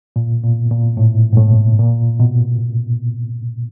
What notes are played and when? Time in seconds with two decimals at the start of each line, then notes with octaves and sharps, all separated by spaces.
0.16 A#2
0.44 A#2
0.71 A#2
0.97 A2
1.33 G#2
1.38 A2
1.79 A#2
2.20 B2